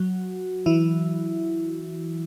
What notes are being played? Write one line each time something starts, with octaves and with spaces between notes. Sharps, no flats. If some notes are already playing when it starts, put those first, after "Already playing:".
Already playing: F#3 F#4
E3 E4